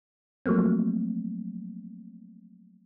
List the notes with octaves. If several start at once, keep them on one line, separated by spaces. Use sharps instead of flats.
F3 F#3 A3 A#3 C4